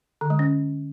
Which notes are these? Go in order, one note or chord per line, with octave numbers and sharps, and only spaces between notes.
D3
G#3
C#4